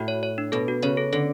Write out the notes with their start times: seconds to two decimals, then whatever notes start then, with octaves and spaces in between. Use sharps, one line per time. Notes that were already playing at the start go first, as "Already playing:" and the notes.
Already playing: A2 F#4
0.08 C#5
0.23 C#5
0.38 D4
0.52 B2 A4
0.68 F#4
0.82 C#3 C#5
0.97 A4
1.12 D3 A4